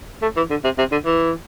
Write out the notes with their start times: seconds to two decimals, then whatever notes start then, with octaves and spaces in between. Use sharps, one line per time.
0.22 A3
0.37 E3
0.50 D3
0.64 C3
0.78 C3
0.92 D3
1.06 E3